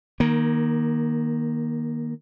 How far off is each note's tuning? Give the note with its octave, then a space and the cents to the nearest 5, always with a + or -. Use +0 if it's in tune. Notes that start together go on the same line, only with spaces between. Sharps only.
D#3 -5 A#3 +20